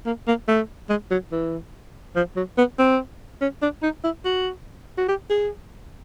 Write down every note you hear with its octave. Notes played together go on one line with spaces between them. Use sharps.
A#3
A#3
A3
G#3
F#3
E3
F3
F#3
B3
C4
C#4
D4
D#4
E4
F#4
F#4
G4
G#4